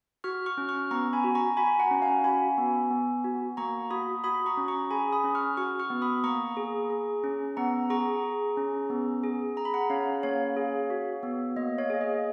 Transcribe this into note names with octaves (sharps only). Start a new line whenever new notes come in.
F#4 C#6 F6
C#6 F6
C#4
C#6 F6
B3 A#5 C#6
G#5 B5
F#4
A#5 C#6
F#4 G#5 B5
F#5 A#5
C#4
F5 G#5
F#4 G#5 B5
B3
B3
F#4
A#3 A#5 C#6
F#4 B5 D#6
F#4 B5 D#6
A#5 C#6
C#4
A#5 C#6
G#4 G#5 B5
B5 D#6
C#4
C#6 F6
F#4 C#6 F6
C#6 F6
B3
B5 D#6
A#3 A#5 C#6
G#4
G#4
C#4
B3 F#5 A#5
G#4 A#5 C#6
G#4
C#4
B3
G#4
G#4 A#5
B5
F#5 A#5
C#4 C#5 F5
A#3 C#5 F5
G#4
F#4
B3
A#3 D#5
C#5 F5
G#4
D#5